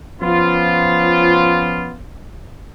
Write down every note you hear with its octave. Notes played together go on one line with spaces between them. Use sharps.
F3 B3 C#4 F4